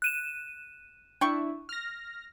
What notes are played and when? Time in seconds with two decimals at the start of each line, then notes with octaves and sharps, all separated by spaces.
0.02 F#6 D#7 E7
1.21 D4 E4 G5 C#6
1.69 F6 A#6